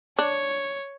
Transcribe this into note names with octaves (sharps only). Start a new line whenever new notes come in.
D4 C#5